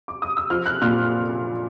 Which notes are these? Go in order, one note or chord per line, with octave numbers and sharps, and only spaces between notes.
D6
D#6
E6
F3 F6
F#6
A#2 F6